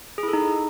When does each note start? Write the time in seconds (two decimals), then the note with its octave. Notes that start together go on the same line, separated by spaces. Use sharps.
0.18 G#4
0.23 E4
0.28 A4
0.33 D#4